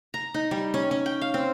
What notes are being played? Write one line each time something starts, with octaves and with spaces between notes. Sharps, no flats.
A#5
D#4
G3
C#4
C#4
G5
F5
C4